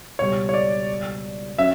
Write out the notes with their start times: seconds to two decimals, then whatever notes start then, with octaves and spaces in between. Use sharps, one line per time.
0.19 C#2 B2 G3 C#5
0.49 C#5
0.54 D5
1.58 F#3 C#4 E5